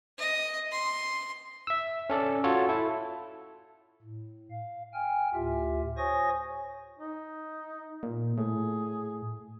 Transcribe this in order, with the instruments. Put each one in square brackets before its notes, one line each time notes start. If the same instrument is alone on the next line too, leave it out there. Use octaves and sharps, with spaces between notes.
[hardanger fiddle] D#5
C6
[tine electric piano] E5 E6
C#4 A4 D5
F4 F#4 A4 C#5
E4 A4
[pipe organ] A2
F5
G5 G#5 F6
D2 A2 F4 G4 E5
C5 C#5 G#5 C#6 D#6 A#6
[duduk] D#4
[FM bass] A#2
[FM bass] A2 [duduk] G#4